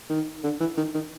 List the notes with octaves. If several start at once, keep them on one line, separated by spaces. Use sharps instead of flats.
D#3
D3
E3
D#3
D#3